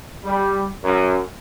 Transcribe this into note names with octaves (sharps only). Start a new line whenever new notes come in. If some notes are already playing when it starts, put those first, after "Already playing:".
G3
F#2